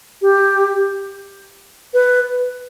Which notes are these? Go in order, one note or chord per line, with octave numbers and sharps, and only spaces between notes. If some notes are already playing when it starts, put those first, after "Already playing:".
G4
B4